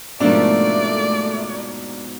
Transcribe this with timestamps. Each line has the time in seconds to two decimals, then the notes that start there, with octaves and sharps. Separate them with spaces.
0.20 G#2 B2 F3 A3 A#3 D4 D5